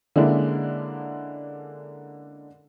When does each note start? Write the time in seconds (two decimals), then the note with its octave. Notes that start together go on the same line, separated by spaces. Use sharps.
0.16 D3 G#3 A#3 C#4 D4 E4